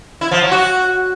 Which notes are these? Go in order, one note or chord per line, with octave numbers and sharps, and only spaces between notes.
E4
F3
F#3
F#4